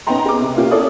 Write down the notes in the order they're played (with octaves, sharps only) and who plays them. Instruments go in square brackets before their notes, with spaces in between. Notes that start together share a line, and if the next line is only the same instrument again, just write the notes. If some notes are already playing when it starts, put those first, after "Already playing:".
[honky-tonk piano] B3 C#4 D#4 G5 A#5 C6
G#4 D6
C3
A#3 C#4 F4 G4
E4 A4 C#5 D5 D#6